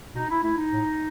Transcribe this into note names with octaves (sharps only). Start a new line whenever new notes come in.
B2 D#4
E4
A3 E4
D#4
A2